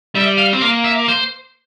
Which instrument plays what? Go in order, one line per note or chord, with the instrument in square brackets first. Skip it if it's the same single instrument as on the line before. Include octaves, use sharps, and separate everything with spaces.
[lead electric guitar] G3 [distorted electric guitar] E5
[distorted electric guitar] F5
[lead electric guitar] C4
[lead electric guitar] A#3 [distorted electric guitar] F5
[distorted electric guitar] E5
C5